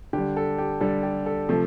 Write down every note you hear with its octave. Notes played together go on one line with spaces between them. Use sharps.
D3 G4
G3
A4
G4
D3 G3 A4
G4
A4
C3 F3 A3